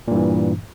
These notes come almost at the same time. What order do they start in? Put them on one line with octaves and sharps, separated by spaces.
A#2 G2 E3